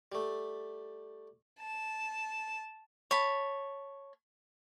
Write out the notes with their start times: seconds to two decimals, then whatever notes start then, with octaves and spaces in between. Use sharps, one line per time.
0.12 G3 A3
1.59 A5
3.11 C#5 A5 B5